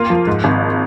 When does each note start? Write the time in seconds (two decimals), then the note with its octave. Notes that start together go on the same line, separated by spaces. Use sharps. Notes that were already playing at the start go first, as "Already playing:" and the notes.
Already playing: A#3 F4
0.10 F3
0.27 G#2
0.44 G#1